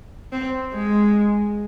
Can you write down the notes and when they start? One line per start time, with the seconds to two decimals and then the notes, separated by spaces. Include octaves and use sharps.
0.33 C4
0.73 G#3